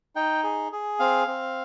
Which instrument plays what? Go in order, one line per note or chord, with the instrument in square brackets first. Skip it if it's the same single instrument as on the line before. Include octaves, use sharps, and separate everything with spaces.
[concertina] D#4 G5
G#4
G#4
C4 F5
C4